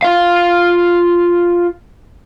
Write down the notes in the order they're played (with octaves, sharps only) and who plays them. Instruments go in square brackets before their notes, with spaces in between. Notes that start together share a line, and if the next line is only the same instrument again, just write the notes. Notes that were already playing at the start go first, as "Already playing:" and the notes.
[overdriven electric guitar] F4 F5